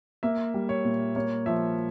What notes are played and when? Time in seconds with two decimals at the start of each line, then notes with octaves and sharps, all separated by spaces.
0.23 A#3 E5
0.54 G3
0.69 C#5
0.85 A#2
1.16 A#3 C#5
1.46 F3 E5